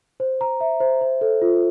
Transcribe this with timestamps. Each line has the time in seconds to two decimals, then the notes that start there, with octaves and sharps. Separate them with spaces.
0.20 C5
0.41 A#5
0.61 E5
0.80 C5
1.01 C5
1.21 A4
1.42 F4